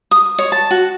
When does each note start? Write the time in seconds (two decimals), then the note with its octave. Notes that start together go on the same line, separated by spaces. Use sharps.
0.11 D#6
0.39 C#5
0.52 A5
0.71 F#4